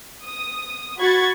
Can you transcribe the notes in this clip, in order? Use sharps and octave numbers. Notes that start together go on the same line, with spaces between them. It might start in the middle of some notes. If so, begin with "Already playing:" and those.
D#6
F#4 B5 C#6 G#6 A6